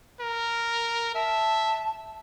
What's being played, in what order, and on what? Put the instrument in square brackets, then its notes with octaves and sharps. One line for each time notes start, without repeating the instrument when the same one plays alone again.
[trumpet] A#4
[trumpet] E5 [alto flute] A5